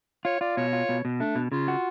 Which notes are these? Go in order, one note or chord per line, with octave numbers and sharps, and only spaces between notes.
F4 C#5
F4 D5
B2 C#5
F4
B2
B2
A3 D4
B2
C#3 F4
F#4